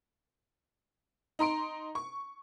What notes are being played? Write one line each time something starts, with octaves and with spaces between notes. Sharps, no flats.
D#4 A#5 C6 D7
C#6